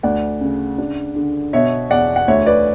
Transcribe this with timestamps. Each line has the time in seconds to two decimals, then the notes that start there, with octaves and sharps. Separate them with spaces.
0.03 D2 D5 F#5
0.41 C#3
0.78 D4
1.16 D3
1.53 B2 C#5 E5
1.90 E2 D5 F#5
2.16 F#5
2.28 D2 C#5 E5
2.46 B4 D5